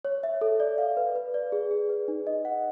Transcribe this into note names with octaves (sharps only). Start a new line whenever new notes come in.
C#5
E5
A4
D5
F5
B4
B4
D5
G#4
G#4
B4
D#4
D#5
F#5